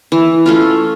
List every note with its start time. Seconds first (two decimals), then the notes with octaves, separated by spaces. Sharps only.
0.12 E3
0.46 A3 C#4 F4